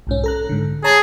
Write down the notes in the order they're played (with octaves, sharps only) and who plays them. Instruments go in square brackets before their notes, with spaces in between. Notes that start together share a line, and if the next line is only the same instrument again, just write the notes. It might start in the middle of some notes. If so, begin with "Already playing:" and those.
[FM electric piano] B1 G#2 C#4
A4 A#5 F#6
G#2 D3
[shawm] G#4 [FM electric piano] C#5 A5 A#5